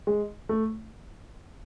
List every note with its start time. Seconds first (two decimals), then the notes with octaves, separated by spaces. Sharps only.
0.07 G#3
0.49 A3